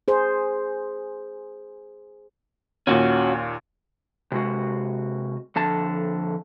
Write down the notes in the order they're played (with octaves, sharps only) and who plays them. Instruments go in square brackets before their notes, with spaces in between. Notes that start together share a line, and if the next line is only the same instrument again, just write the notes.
[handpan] G#4 C5
[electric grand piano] D#2 A#2 [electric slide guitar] C#4 F#4
[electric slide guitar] C3 G#3 F#4
F2 D3 A5